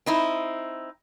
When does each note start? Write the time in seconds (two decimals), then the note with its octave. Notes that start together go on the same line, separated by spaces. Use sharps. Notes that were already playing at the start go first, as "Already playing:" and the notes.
0.06 C4 D#4 E4